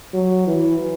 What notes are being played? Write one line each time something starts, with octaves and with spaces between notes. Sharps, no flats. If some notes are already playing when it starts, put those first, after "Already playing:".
F#3
E3